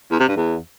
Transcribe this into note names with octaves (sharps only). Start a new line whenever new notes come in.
E2
C3
G2
E2